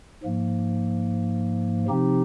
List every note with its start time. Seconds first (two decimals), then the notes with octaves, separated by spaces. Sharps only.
0.23 G#2 F3 A#3
1.88 C3 F3 C4 D#4 G4